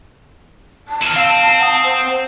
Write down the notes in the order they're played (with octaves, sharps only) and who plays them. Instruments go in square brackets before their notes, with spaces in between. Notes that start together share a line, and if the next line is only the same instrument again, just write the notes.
[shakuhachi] A5
[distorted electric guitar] D#3 E4 [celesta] F6 D#7
[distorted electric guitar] C4 [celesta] F5 E6
[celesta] F#5 D#6
[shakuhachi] C5